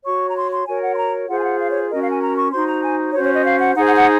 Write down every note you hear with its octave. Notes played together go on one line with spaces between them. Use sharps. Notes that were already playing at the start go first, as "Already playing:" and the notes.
F#4 C#5 C#6
A#5
C6
C6
F#4 A#4 C#5 G#5
F#5
C6
A#5
F4 G#4 C5 F#5
G#5
F#5
F5
C#5
C#4 F#4 A#4 D#5
F5
G#5
A#5
C#6
D#4 F#4 C5 C6
A#5
G#5
C#4 F#4 C5 C#5
C#5
D#5
F5
F#5
D#4 G#4 C5 F#5
F#5
F#5